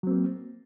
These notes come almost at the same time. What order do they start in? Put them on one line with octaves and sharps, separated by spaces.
F#3 C4 A#3